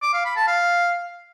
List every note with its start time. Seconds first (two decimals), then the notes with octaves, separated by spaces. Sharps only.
0.02 D6
0.14 F5
0.25 B5
0.36 A5
0.47 F5